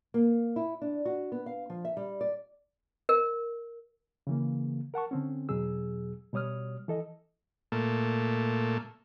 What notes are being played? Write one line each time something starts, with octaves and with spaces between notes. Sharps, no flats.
A#3
E4
D4
F#4
B3
F5
F3
E5
G3
D5
A#4
C#3 E3 A#3
A#4 F#5 A5 C#6
D3 C4 C#4
E2 B2 F#3 G#4 E6
B2 G3 C#5 D#6 F6
E3 A4 D#5
A#2 A3